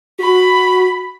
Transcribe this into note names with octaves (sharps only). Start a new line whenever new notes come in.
F#4 B5